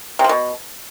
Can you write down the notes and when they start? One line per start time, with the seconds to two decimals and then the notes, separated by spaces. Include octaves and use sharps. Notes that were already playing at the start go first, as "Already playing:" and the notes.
0.19 C3
0.24 F3
0.29 B2